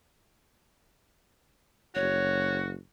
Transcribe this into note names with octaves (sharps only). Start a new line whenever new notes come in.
F#1 F#4 C#5